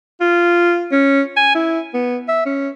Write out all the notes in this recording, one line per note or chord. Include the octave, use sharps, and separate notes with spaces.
F4
C#4
G#5
E4
B3
E5
C#4